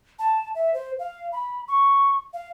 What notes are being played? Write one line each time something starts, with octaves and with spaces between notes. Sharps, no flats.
A5
E5
C5
F5
B5
C#6
F5